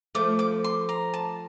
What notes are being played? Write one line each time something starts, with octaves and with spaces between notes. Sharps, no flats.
F3 A3 D6
D6
C6
A#5
A5